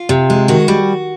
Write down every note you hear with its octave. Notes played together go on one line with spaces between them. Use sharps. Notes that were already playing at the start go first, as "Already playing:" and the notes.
Already playing: F4
C3
G#3
D#3 F#4
G3